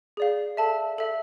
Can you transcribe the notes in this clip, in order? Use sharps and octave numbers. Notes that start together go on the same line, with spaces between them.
G#4 D5 F5
A4 E5 A5
A4 E5